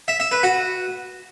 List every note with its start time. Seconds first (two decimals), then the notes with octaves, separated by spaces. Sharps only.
0.08 E5
0.20 E5
0.32 B4
0.43 F#4